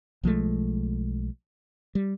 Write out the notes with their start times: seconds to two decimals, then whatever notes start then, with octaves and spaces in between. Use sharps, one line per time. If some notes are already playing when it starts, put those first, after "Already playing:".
0.23 B1 F3 G#3 A3
1.95 G3